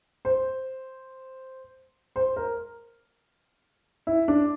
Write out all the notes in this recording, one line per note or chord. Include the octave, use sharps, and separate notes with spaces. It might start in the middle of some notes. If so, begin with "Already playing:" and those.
C5
C5
A#4
E4
D4